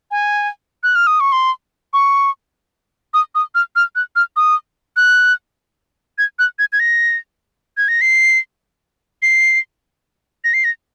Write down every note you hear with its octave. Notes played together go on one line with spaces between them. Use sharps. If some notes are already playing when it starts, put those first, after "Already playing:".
G#5
F#6
F6
D#6
C#6
C6
C#6
D#6
D#6
F6
F6
F#6
F6
D#6
F#6
G#6
F#6
G#6
G#6
A#6
G#6
A#6
C7
C7
A#6
C7
A#6